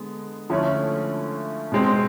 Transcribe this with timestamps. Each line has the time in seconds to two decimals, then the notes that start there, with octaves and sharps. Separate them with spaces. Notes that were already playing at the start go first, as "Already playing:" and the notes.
Already playing: D3 G#3 B3
0.50 D3 F3 A3 C#4 E4
1.72 B2 G#3 C4